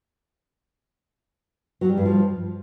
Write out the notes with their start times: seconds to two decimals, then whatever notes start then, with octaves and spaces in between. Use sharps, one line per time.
1.81 F#3
1.89 G3
1.97 G2
2.05 F3